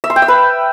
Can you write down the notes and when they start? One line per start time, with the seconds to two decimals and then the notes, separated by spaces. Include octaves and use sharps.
0.04 E5
0.10 C6
0.16 G5
0.22 E5
0.28 B4